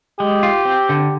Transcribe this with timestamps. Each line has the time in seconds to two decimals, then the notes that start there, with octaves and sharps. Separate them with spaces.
0.20 G#3 G4
0.43 F4
0.65 C4
0.89 D3